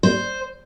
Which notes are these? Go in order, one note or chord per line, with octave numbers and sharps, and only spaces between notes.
C5